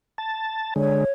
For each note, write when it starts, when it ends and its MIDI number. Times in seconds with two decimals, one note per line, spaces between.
0.18 0.74 81
0.76 1.04 50
0.76 1.04 56
0.76 1.13 73